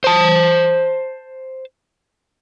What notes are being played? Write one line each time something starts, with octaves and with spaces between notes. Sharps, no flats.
C5 A5